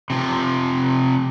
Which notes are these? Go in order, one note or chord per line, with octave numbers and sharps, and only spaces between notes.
C3 F3